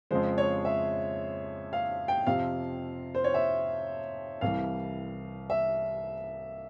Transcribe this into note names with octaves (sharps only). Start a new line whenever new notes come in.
F2 C#3 F3 G#3 C5
C#5
E5
F5
G5
F2 C3 F3 F5
C5
C#5
E5
C2 C3 E3 G3 F5
E5